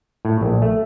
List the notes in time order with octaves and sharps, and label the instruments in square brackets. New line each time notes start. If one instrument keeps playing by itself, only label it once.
[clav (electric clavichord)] A2
A#1
A3